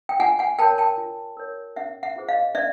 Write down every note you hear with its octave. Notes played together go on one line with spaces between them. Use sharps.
G5
F4 F#5 G#5
F#5 G#5
A#4 C#5 G5 A5
G5 A5
F4
A#4 C#5
C#4 E5 F#5
E5 F#5
F4 G#4 C5
D#5 F5
C#4 D5 E5